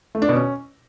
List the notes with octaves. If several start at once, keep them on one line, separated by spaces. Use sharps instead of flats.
A3
D4
B2
C#4